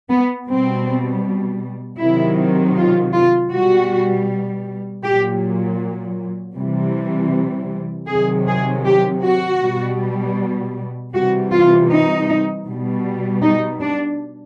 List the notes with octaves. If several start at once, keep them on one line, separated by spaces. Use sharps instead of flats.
B3
B2 G3 C4
C3 D#3 F#3 E4
F4
F4
B2 G3 F#4
A#2 F#3 G4
C3 E3 G3
C3 D#3 F#3 G#4
G#4
G4
F#4
B2 G3
C3 E3 G3 F#4
F4
D#4
B2 G3
D#4
D4